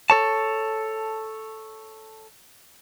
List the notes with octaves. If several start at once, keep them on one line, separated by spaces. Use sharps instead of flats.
A4 C#5 A5